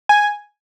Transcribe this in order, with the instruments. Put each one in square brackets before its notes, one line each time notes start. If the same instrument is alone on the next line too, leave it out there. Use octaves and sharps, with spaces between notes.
[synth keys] G#5